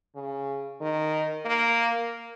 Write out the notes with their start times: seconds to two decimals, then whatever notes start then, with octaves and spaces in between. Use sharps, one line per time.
0.15 C#3
0.81 D#3
1.45 A#3